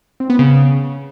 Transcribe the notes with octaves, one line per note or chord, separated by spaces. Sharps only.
C4
B3
C#3